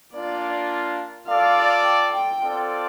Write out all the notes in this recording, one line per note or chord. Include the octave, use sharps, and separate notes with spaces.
A#3 D4 F4 D5
F4 A4 D5 F5
G5
G5
C4 F4 A4 D5